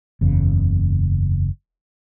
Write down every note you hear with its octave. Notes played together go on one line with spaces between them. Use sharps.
F#1 E2 C#3